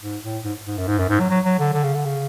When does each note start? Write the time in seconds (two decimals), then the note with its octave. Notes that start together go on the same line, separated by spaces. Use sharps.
0.03 G#2
0.23 A2
0.45 G#2
0.67 G#2
0.78 F#2
0.87 G#2
0.98 F#2
1.09 G#2
1.20 F#3
1.30 F#3
1.45 F#3
1.59 D3
1.73 D3
1.84 C#3
1.94 D3
2.05 C#3